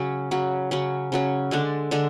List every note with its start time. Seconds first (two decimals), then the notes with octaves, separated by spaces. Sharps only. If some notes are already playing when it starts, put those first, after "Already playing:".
Already playing: C#3 F#3 C#4
0.31 C#3 F#3 C#4
0.71 C#3 F#3 C#4
1.12 C#3 F#3 C#4
1.51 D3 G#3 D4 A4
1.91 D3 G#3 D4 A4